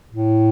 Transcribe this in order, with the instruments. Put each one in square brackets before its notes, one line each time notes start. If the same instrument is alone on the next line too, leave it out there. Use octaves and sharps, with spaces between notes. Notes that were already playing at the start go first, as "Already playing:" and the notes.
[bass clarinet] A2